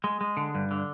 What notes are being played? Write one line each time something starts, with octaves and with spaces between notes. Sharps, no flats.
G#3
G#3
D3
G2
D3